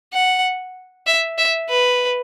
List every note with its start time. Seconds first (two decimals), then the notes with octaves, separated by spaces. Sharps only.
0.13 F#5
1.06 E5
1.38 E5
1.69 B4